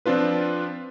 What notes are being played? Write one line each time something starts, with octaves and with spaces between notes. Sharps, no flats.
F3 C4 D4 F4 B4